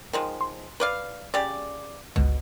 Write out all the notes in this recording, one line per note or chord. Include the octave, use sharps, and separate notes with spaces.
D#3 F3 G#3
C6
B4 D5 F5
C#3 G4 D5
G1 C#2 B2